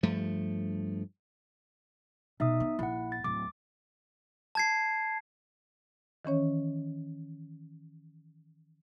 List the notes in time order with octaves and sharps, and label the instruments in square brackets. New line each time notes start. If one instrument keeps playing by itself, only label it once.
[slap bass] G2 F3 A3
[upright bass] B2 [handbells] D#4 E5 D#6
[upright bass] B3
[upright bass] A#1 [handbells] E4 F#5
[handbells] A6
[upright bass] D1 [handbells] D6
[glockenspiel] A5 G#6 C7
[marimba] D#3 E3 C#4 C#5